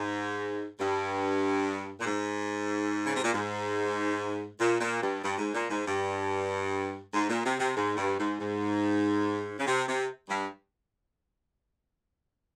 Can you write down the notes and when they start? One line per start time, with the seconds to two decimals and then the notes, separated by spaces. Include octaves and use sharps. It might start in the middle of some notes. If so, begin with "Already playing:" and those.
Already playing: G#2
0.79 G2
2.00 A#2
2.06 G#2
3.05 C#3
3.15 C3
3.23 A#2
3.33 G#2
4.59 A#2
4.80 A#2
5.01 G2
5.22 G2
5.38 G#2
5.54 A#2
5.70 G#2
5.86 G2
7.13 G#2
7.28 A#2
7.44 C3
7.59 C3
7.76 G#2
7.96 G2
8.18 G#2
8.39 G#2
9.58 C#3
9.66 C3
9.87 C3
10.29 G2